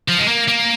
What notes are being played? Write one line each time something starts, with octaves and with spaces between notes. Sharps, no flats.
F3
G#3
A#3
A#3